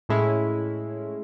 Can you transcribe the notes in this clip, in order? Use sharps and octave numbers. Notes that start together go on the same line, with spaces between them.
A2 G#3 C#4 E4